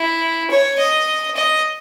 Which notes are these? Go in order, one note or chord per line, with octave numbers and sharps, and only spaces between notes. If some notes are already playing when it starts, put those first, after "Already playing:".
Already playing: E4
C#5
D#5
D#5